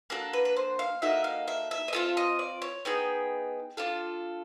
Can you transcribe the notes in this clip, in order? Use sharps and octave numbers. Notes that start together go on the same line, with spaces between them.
A#3 D4 F#4 A4
B4
B4
C5
F5
A#3 D#4 F#4 A4 E5
F5
E5
E5
D#5
C4 F4 A4 E5
D#5
D5
C#5
B3 D#4 G#4 G5
D4 F4 A4